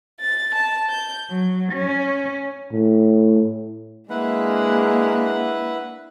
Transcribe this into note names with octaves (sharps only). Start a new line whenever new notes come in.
A6
A5
G6
F#3
C#4
A2
G#3 A#3 D4 E4 B4 F#5